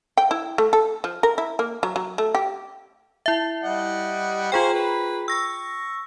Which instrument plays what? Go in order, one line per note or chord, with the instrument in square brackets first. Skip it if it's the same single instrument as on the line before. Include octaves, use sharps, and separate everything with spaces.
[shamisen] G5
E4
A3
A4
F3
A#4
E4
A#3
F#3
F#3
A3
G4
[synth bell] E4 E5
[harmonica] G3 D#5 F#5
[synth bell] F4 G#4 G5 [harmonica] C5 F5 G#5
[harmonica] B4 B5
[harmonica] C#6 [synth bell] E6 A#6